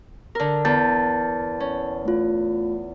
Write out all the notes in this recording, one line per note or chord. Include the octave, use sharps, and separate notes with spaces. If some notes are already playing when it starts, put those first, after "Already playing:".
D3 A#4
E2 A5 G6 A6
C#4
A3 F4